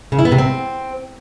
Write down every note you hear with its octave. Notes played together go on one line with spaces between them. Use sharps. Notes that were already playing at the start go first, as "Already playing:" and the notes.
C#3
E4
B3
C3
C4